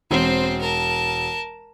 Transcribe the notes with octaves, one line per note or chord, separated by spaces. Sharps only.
E1 C4 C5
A#4 A5